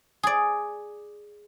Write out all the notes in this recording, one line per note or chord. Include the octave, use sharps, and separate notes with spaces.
G#4 D5